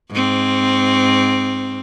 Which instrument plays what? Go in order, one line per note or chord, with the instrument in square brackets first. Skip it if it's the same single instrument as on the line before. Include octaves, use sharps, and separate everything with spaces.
[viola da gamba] G#2 C4